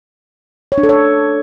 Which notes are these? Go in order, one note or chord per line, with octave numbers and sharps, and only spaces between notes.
C#5
D4
A4
C#5